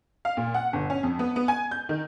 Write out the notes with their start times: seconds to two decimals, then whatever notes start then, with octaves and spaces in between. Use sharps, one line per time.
0.25 F5
0.37 A#2
0.54 F#5
0.73 G1
0.90 C#4
1.03 F2
1.19 B3
1.36 B3
1.48 G#5
1.71 G6
1.89 D#3